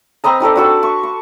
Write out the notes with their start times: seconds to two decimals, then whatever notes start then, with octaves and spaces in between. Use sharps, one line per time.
0.24 C4 B4 D#5 A#5
0.40 D#4 G4 A4 D5
0.56 D4 F#4 A4 B4
0.83 C#6
1.03 C#6